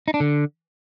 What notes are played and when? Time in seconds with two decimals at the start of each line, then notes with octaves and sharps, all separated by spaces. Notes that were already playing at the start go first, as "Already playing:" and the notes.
0.08 D#4
0.14 D4
0.20 D3